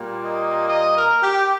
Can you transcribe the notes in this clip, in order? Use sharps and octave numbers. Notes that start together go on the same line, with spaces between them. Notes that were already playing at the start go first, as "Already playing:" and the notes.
Already playing: A#2 G3 A#3
D#5
D#5
A#4
G4